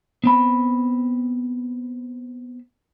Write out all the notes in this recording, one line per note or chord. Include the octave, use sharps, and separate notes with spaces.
B3 C4 B5